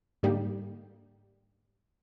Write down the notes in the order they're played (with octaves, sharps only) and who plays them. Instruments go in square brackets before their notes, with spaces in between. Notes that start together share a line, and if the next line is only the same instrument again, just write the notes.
[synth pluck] G#2 D3 G3 A#3 D#4 G4